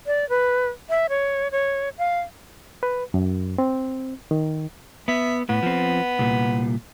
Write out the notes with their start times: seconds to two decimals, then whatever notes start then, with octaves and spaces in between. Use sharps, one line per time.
0.07 D5
0.29 B4
0.90 E5
1.09 C#5
1.52 C#5
1.98 F5
2.83 B4
3.14 F#2
3.58 C4
4.31 D#3
5.08 B3 E5
5.49 A2 B3
5.63 F3 C4
6.19 C2 A#2